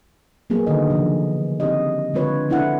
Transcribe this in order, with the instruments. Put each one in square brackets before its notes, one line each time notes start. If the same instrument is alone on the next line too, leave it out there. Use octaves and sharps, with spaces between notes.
[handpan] F#3 A#3 B3 G#4 A#4
D3 D#3 A4 D#5
C#3 F3
C4 D#4 G4 D#5
D3 G#3 C4 F4 B4 C#5
B3 D4 E4 A4 F#5